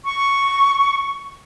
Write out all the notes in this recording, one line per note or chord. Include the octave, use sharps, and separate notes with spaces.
C#6